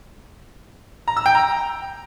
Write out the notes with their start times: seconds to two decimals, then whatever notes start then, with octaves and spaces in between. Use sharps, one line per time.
1.08 A#5
1.17 E6
1.26 G5
1.35 A#5